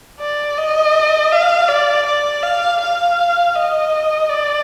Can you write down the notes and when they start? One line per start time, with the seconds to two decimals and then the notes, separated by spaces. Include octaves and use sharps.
0.20 D5
0.57 D#5
1.32 F5
1.68 D5
2.06 D5
2.43 F5
2.81 F5
3.55 D#5
4.29 D5